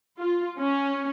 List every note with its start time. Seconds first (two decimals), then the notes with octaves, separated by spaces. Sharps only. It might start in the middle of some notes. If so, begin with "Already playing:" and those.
0.19 F4
0.58 C#4